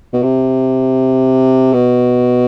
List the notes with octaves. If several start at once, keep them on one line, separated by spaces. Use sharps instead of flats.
B2
C3
B2